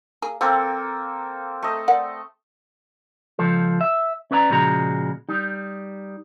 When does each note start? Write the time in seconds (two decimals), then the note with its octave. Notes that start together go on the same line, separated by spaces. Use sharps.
0.22 A#3 G#4
0.41 F3 A#3 C4 A4
1.63 A3 D#5
1.88 A#4 D5 F#5
3.39 C#2 F3 F4 A4
3.81 E5
4.31 C#4 B4 D5 D#5 A#5
4.50 A#2 C#3 F3 G#3 F#4 A#5
5.29 G3 D#4